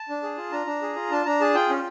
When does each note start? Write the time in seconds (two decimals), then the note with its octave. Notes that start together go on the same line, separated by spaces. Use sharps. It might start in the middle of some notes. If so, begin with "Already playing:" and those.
Already playing: A5
0.09 D4
0.23 G#4
0.38 F4
0.52 D4 A#5
0.67 D4
0.82 G#4
0.96 F4
1.11 D4 A5
1.26 D4 A#5
1.40 G#4 A5
1.55 F4 G5
1.70 C#4